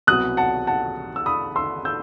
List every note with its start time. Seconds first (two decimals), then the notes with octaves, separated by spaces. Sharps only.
0.07 C2 B2 F#3 B3 D#6 F#6
0.37 F#5 A5
0.67 F#5 A5
1.16 E6
1.26 B5 D#6
1.56 C6 E6
1.85 E6 G6